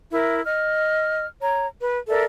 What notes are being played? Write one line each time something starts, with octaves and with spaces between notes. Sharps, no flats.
E4 A#4 E5
D#5 F6
C#5 A#5
B4
A4 A#4 D5 E5